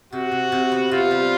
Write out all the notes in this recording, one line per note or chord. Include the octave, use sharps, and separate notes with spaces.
C3 F#4
C3
C3
B3
C3 F4
G3